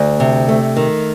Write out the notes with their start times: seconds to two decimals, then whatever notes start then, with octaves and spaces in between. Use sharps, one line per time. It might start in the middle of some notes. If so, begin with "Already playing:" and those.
Already playing: D2
0.20 C3
0.49 A3
0.76 D#3